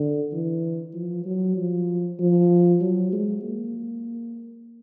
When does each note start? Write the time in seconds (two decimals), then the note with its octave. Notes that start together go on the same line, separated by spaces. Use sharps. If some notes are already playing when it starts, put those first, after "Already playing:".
Already playing: D3
0.33 E3
0.94 F3
1.26 F#3
1.56 F3
2.19 F3
2.81 F#3
3.12 G#3
3.43 A#3